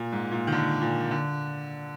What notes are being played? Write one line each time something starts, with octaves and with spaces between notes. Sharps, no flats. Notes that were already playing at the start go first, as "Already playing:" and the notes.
Already playing: A#2
G#2
A#2
D#3
D3
A#2
D3